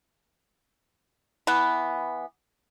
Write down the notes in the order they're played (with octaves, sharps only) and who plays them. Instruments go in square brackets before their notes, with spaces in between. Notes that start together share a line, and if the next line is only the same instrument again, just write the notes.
[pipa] E3 B3